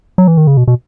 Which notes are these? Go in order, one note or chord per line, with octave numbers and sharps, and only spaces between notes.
F#3
E3
D#3
C#3
B2
B2